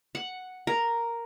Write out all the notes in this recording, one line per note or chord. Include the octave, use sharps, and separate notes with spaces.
F#5
A#4